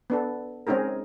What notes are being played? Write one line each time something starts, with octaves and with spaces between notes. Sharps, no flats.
B3 D4 A4
G#3 C4 C#4 D#4 G#4 A#4